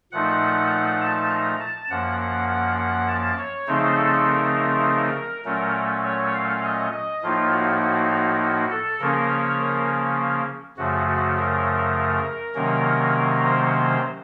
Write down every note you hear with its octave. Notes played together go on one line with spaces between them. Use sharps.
A#2 F3 A3 D#4 F#5
A5
A#5
A5
F#2 F3 A#3 F#5
F#5
F#5
F#5
A5
C#5
C#3 F3 A3 C4 D#4 C5
A4
A#4
A#2 F#3 A3 C#4 A#4
C#5
F5
D#5
D#5
A2 F3 A#3 D#4 F4
F#4
F#4
F#4
F#4
A4
C#3 F3 A#3 C#4 A#4
C#5
A#4
F#2 C#3 F3 A3 F#4
F#4
A#4
C3 D#3 F#3 A#3 C#4
C5
C5